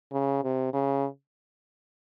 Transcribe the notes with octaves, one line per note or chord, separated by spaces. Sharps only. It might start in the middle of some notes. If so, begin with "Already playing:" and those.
C#3
C3
C#3